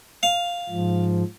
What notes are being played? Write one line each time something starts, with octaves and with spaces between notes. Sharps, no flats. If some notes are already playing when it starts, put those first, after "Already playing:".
F5
G#2 F3